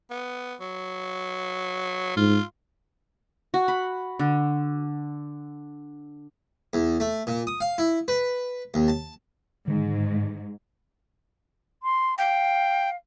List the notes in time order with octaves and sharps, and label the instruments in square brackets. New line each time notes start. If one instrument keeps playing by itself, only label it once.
[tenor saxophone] B3
F#3
[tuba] G#2 [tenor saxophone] F4
[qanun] F#4
B5
D3
[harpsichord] E2
A3
A#2
D#6
F5
E4
B4
D#2
A5
[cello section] G#2 [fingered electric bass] D3 D#3 G#3
[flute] C6
[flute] F5 [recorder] G5